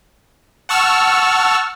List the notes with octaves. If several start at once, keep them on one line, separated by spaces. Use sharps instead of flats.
F#5 A5 C#6 E6 F6